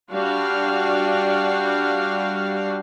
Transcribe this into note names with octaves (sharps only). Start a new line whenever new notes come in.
G3 D4 F#4 F5